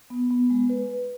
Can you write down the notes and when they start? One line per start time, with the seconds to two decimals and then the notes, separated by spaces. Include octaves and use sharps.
0.10 B3
0.30 B3
0.50 G#3
0.70 B4
0.90 B4